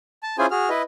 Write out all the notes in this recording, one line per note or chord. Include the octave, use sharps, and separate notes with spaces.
A5
C#4 E4 F4 G#4 C5 G#5
F#4 G#4 F6
E4 B4 D#5